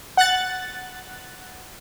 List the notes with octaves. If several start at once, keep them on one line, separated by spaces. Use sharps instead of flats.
F#5 F#6 A6